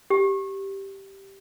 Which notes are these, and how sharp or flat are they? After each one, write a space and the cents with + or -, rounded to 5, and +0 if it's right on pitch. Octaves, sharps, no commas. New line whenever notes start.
G4 -5